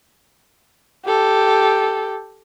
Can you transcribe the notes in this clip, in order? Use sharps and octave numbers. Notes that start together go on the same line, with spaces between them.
G4 A4